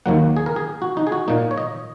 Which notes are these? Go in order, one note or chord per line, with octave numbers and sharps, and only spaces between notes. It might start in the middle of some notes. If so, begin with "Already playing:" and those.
D#2 D#3 F#3 A#3 F#5
G#4
A#4
G#4
F#4
D#4
G#4
F#4
A#2 A#3 D#4
C#5
D#5